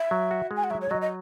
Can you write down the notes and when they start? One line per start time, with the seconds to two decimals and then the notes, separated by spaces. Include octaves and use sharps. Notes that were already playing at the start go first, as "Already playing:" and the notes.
Already playing: E5
0.11 F#3
0.31 F#4
0.51 G#3
0.56 G#5
0.64 F#5
0.70 F#3 E5
0.81 C#5
0.91 F#3 D#5
1.01 D#5